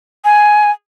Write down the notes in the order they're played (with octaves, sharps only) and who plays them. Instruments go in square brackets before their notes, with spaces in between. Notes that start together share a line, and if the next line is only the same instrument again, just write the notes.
[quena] G#5